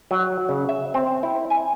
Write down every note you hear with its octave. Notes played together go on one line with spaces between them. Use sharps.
F#3
C#3
E5
C4
E4
G#5